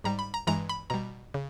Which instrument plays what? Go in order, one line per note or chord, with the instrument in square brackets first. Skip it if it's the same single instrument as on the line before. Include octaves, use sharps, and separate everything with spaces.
[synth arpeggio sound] G#2 G3 A#5
B5
A#5
G2 E3 G#3 A#5
B5
B2 G3 A#5
C#3